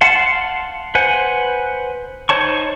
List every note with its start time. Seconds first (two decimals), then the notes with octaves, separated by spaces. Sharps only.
0.01 F5 F#5 A5 C6
0.95 B4 C5 F#5 G#5
2.29 D#4 C5 C#5 A5 C#6